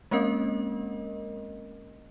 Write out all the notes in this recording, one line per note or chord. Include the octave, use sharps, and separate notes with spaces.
G#3 A#3 C4 C#4 A#4 D#5